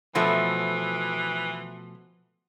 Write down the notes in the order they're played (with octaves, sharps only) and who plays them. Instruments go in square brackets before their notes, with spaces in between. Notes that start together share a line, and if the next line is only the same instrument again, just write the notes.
[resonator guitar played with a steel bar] B2 F3 A3 [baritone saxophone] E3